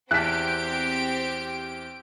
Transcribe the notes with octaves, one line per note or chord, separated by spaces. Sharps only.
E2 C4 G4 A5 F#6 B6 D7